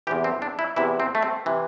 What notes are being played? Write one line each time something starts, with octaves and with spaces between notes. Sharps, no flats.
E2 C3 E3 G4
C4
D4
E4
E2 C3 E3 E4
C4
A3
C4
C3 E3